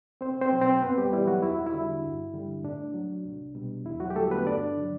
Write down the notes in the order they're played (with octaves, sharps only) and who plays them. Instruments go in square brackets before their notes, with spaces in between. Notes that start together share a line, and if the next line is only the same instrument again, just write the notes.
[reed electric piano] C2 C4 C5
C4 C5
B2 F#3
C4 C5
F#2 B3 B4
G3 G4
E3 G3 E4
F#3 F#4
E2 E4
F#4
E4
D3 G3
G2
D3 G3
A2 D4
F#3
C2
B2 G3
E2 E4
F#3 F#4
G4
D3 G3 A3 A4
B3 B4
G2 D4 D5
D3 F#3